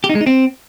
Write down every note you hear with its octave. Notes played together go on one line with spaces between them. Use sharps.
G4
D#4
G#3
D#4
C4